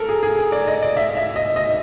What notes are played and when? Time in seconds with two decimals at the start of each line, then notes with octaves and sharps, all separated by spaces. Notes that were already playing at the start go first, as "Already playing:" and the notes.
Already playing: A4 A#4
0.09 G#4
0.23 G#4
0.52 D5
0.67 D#5
0.82 D5
0.97 E5
1.17 E5
1.36 D#5
1.56 D#5